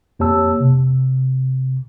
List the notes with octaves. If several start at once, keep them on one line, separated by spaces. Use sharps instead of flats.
F2 A#3 G4 C#5 A5 E6
C3